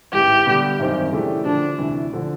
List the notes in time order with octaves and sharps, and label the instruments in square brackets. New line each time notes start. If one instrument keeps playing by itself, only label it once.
[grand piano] A1 G#2 E3 [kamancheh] G4
[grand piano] D3 G3 B3
G#1 F#2 D#3 G3 C4
C#3 E3 A3 D4 G4
[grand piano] D3 F3 A3 [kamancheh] D4
[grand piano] D2 C3 E3
D3 F3